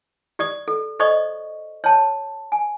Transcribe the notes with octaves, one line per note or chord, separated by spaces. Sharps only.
G4 D5 D#6
A4
A4 C5 D5 D#5 C#6 D#6
C#5 A5
G#5